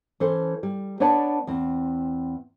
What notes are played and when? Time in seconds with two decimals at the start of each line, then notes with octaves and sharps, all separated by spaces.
0.20 E3 C#4 A4 C5
0.63 G3
1.00 B3 D4 B4 C#5 D5 A5
1.47 E2 C4